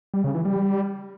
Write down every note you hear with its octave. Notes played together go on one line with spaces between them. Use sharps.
G3
C#3
E3
G3